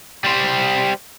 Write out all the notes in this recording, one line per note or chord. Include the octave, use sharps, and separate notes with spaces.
G3 C5